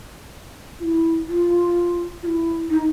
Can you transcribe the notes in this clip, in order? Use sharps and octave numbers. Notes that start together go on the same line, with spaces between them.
F4
E4
F4
F4
E4
D#4